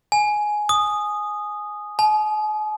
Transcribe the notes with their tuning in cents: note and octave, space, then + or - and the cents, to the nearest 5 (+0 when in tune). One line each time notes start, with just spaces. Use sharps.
G#5 +10
D#6 -10
G#5 +45